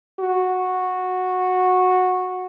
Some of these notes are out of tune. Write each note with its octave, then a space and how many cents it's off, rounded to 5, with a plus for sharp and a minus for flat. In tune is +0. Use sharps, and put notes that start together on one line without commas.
F#4 -10